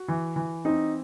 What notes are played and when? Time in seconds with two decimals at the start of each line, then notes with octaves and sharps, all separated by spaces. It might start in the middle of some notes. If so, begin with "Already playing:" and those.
Already playing: F#4
0.08 E3
0.36 E3
0.65 C4 D#4